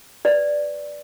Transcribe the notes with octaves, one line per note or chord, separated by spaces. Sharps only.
B4 D5